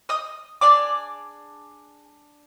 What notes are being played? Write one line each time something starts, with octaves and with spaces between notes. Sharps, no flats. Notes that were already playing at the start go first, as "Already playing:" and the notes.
D#5 D#6
D4 G#4 D5 D6